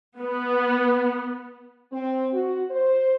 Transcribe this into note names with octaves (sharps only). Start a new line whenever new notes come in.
B3
C4
F#4
C5